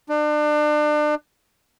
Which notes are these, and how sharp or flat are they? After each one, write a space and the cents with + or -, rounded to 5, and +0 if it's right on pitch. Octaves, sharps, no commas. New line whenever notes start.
D4 +35